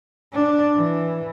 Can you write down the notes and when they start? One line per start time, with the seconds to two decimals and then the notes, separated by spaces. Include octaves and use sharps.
0.33 D4
0.75 E3